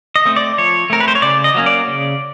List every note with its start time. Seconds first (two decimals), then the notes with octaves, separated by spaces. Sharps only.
0.16 D#5
0.25 A3 C4
0.36 D5
0.58 F3 C#5
0.90 A3 C4 A#4
1.00 B4
1.08 C5
1.15 C#5
1.22 C#3 D5
1.44 D#5
1.54 F#3 A#3 C#4
1.66 D5
1.88 C#3